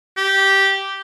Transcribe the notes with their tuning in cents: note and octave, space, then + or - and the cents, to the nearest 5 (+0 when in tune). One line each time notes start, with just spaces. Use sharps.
G4 -10